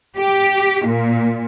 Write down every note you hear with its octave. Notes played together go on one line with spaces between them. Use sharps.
G4
A#2